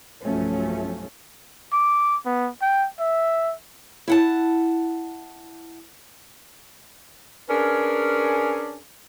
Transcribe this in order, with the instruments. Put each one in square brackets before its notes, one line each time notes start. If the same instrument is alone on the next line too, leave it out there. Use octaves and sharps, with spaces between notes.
[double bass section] B1 G2 F3 F#3 A3 C#4
[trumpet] D6
B3
G5
E5
[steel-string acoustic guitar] E4 F#5 A5
[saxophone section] C#4 D4 G#4 A#4 B4